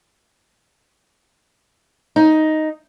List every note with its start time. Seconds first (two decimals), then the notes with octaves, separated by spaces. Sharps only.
2.16 D#4